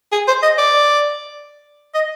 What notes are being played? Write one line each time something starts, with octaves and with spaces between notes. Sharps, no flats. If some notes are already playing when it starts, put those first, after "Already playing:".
G#4
C5
D#5
D5
D#5